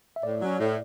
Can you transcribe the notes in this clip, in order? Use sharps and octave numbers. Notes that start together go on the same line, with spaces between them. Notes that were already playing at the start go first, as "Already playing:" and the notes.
E5
A2 D5
F#3 C#4
A2